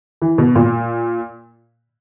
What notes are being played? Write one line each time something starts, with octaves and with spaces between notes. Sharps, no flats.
E3
B2
A#2